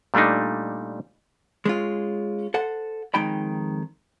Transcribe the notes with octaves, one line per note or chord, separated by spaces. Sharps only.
A#2 G3 A3 D4 D#4
G#3 C#4 F4
A4 C5 F#5
F2 D#3 G#3 D#4 G5 B5